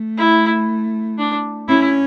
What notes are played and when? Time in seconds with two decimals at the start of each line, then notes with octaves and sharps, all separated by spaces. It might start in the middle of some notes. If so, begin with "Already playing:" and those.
Already playing: A3
0.18 E4
1.18 D4
1.68 C#4 E4